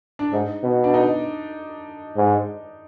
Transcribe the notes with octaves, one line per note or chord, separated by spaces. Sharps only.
D4
G#2 D#4
B2
D4
D#4
G#2